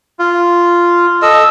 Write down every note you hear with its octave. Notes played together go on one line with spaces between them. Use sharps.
F4
A4 D#5 E6